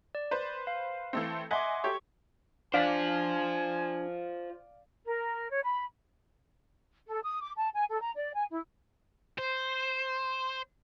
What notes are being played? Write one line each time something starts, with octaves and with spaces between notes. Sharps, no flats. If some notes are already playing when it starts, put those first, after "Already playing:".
D5
B4 C5
F5
E3 A3 C4
D#5 E5 F#5 G#5 C6 D6
G4 A4 C#5 C#6
D4 F4 C5 D5 F5 G#5 B6
A#4
C#5
B5
A4
D#6
D6
A5
G#5
A4
A#5
D5
G#5
E4
C5